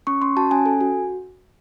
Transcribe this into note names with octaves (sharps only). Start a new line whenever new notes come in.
C#4 C#6
C#4 C6
F#4 A5
C#4 G#5
A4
F#4